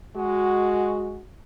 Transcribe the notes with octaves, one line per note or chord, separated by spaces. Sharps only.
G#3 F#4